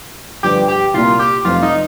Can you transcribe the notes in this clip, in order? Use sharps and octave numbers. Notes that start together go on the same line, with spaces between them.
G1 G2 F3 G4
G4
C2 A#2 A#3 F4
G4
F1 F2 F3 F4
D#4